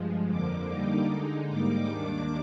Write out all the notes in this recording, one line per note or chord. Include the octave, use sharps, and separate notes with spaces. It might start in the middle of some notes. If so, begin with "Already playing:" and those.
Already playing: G2 F3 G#3
F2 D3 F3 A#3 D6
D3 G3 A#3 D#4
D3 G#3 D#4
G#2 G3 A#3 D#4 D6
D#2 D#3 A#3 D4